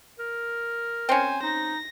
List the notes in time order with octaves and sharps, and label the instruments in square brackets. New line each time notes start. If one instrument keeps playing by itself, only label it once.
[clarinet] A#4
[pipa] C4 C#4 [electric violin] C5 G#5
[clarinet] D#4 [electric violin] A#6